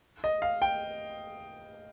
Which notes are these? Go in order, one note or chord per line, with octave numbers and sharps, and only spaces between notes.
D#5
F5
G5